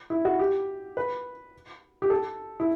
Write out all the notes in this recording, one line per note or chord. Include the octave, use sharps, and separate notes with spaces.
E4
F#4
G4
B4
G4
A4
E4